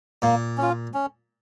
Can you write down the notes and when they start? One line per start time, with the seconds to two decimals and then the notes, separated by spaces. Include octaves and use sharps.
0.22 A#2 A#3
0.58 C#4 F4
0.94 C#4